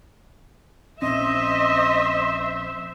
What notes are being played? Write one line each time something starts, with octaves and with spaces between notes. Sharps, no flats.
A#1 C4 C#4 C5 D#5 E5 C6